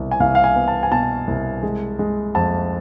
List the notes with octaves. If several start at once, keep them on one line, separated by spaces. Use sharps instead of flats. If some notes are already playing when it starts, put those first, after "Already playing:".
Already playing: C2 B2
G#5
C2 F5
F5
G#5
B3
A5
G#5
B2 A5
C2
G#3
G#3
F2 A5